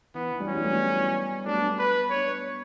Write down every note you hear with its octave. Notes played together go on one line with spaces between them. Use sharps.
E3 B3
E3
G3
F#3 C#4
E3 G3
F#3 A3
G3 B3
F#3 A3 D4
G3 B3
B4
B3 D4 C#5